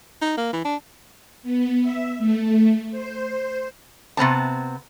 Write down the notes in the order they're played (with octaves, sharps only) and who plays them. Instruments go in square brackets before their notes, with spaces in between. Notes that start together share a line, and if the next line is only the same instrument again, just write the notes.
[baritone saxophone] D#4
A#3
E3
D4
[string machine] B3
E5
A3
C5
[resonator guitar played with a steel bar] C3 B3 C4 A5